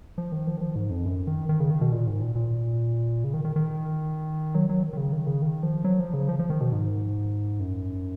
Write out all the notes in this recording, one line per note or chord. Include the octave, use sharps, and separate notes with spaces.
F3
D#3
F3
D#3
F3
G#2
F2
F#2
D#3
D#3
C#3
D#3
B2
A#2
G#2
A#2
A#2
C#3
D#3
D#3
D#3
F#3
F#3
D#3
D#3
C#3
D#3
C#3
D#3
F3
F#3
F3
C#3
F3
F3
D#3
B2
G#2
F#2